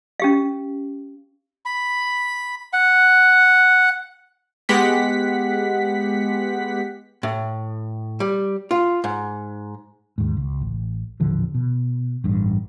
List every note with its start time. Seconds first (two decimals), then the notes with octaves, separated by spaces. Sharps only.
0.20 C#4 G4 F5
1.66 B5
2.73 F#5
4.69 G#3 B3 G4 F#5 B6
7.23 A2
8.20 G3
8.71 F4
9.04 G#2
10.18 D#2 G#2
10.37 C#2
10.61 A1
11.20 D#1 A1 D3 F3
11.54 B2
12.24 A1 G2